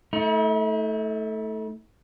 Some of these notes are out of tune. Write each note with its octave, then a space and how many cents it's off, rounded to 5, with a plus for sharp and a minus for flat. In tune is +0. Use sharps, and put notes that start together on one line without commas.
A3 +0 E4 -45